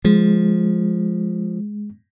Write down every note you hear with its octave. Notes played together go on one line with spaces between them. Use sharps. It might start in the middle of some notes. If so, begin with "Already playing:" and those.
F3 G#3